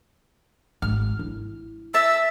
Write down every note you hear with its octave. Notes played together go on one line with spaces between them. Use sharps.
G#1 F6
E4
E5 A5 E6